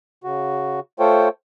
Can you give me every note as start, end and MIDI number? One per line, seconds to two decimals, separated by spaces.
0.24 0.80 49
0.24 0.80 66
1.00 1.29 57
1.00 1.29 65
1.00 1.29 69
1.00 1.29 72
1.00 1.29 73
1.00 1.29 79